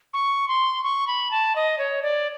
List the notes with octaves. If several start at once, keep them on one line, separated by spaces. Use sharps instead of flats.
C#6
C6
C#6
B5
A5
D#5
C#5
D5